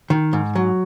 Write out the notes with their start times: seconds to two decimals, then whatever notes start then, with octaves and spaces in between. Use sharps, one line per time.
0.10 D#3
0.33 G#2
0.55 F#3